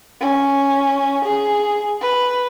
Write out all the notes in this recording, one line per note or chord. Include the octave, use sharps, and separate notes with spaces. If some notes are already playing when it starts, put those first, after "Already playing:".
C#4
G#4
B4